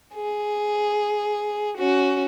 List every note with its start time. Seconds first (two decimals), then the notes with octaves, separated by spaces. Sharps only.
0.14 G#4
1.78 C#4 F#4